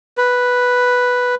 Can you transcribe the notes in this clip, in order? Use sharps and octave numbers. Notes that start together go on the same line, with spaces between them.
B4